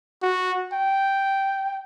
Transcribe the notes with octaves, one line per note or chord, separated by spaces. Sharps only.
F#4
G5